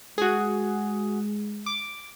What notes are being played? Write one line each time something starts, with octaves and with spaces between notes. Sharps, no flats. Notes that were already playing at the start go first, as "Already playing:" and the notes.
G#3 F#4 G#4
D6